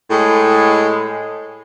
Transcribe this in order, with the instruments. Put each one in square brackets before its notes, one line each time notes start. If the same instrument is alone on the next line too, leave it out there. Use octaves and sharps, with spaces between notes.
[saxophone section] A2 G#3